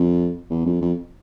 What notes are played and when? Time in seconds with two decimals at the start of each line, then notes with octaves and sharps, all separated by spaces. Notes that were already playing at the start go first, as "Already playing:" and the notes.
Already playing: F2
0.50 E2
0.66 F2
0.82 F2